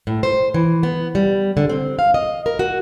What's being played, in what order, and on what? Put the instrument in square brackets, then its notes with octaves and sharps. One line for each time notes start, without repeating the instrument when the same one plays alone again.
[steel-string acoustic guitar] A2
C5
E3
B3
G3
D3
C4
F5
D#5
A#4
F#4